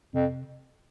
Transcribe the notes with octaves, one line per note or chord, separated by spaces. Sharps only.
F2 C3